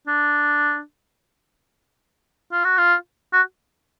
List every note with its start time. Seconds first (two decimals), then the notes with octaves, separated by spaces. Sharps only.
0.07 D4
2.52 F4
2.65 F#4
2.78 F4
3.33 F#4